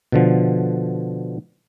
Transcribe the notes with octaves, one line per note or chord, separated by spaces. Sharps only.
B2 D3 F3